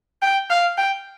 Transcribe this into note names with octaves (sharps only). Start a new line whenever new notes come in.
G5
F5
G5